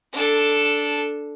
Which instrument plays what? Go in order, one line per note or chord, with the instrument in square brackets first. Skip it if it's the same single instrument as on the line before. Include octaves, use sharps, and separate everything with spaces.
[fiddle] D4 A4